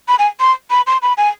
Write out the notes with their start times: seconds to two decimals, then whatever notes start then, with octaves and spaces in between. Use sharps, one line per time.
0.08 B5
0.19 G#5
0.40 C6
0.70 B5
0.87 C6
1.02 B5
1.17 G#5